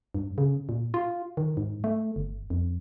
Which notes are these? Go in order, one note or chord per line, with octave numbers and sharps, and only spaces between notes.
G2
C#3
A#2
F4
D#3
G#2
A3
G1
F2